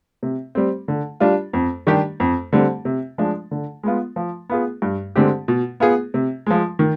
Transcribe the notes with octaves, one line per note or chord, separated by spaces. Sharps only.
C3
G3 C4
D3
G3 D4 F4
F2
D#3 G3 D4 G4
F2
D3 G3 C4
C3
F3 G#3 D4
D3
G#3 B3 F4
F3
B3 F4 G#4
G2
D3 G#3 C4 G4
B2
B3 F4 G#4
C3
F3 G#3
D#3